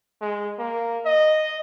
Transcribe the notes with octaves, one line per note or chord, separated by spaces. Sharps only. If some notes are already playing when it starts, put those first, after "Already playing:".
G#3
A#3
D#5